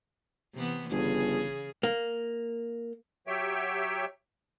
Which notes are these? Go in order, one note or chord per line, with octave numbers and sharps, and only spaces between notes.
C3 E3 B3
G1 C#3 G#4
A#3
F#3 G4 C#5 E5 G5